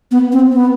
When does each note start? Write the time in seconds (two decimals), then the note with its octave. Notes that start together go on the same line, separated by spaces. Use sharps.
0.11 B3
0.32 C4
0.53 B3